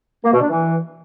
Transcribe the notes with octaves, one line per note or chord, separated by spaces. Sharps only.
A#3
B2
D4
E3